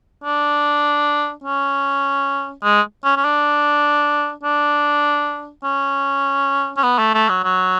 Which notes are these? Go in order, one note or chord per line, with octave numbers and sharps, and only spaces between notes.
D4
C#4
G#3
C#4
C#4
D4
D4
C#4
C#4
B3
A3
A3
F#3
F#3